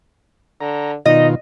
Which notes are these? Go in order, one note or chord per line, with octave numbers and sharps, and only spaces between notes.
D3 A#5
B2 D#3 D#4 F4 D#5